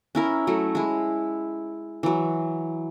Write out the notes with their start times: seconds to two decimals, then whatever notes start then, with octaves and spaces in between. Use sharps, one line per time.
0.15 C#4 E4 A#4
0.47 F#3 A3
0.75 G#3 E4
2.03 E3 F#3